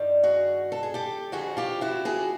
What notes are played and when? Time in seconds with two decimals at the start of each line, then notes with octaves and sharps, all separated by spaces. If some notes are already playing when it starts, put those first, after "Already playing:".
Already playing: G2 D#3 G3
0.23 F#4 G#4
0.72 A4
0.83 G#4
0.94 G4 A4
1.32 F2 D3 F3 F#4 G#4
1.57 F4 G4
1.81 E4 F#4
2.05 F#4 G#4